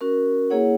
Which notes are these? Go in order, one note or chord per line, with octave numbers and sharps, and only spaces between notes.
C#4 F#4 A#4
A#3 E4 G#4 C#5 F#5